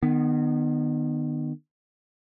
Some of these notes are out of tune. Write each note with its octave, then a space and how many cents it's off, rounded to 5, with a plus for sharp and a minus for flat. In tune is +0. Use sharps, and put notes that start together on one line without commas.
D#3 -35 B3 +0